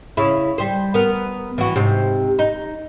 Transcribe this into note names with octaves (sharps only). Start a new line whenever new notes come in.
C#3 E4
G3 C5
B3 A#4
E3 F#4
G#2 C3
D#4